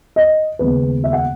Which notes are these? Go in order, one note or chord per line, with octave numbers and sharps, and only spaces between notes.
D#5
D#2 C#3 G#3 B3 B4
E5
F#5